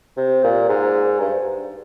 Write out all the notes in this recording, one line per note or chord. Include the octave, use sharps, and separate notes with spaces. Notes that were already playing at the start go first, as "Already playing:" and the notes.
C3
A#2
G#2
G2